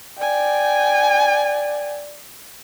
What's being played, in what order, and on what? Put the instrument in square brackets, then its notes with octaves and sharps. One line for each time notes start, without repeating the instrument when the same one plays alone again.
[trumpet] D5 [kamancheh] G5 G#5